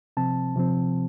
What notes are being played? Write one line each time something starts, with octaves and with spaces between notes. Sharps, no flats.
C3 F3 C4 A5
C3 F3 C4